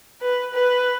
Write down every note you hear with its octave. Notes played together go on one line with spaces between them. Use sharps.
B4
B4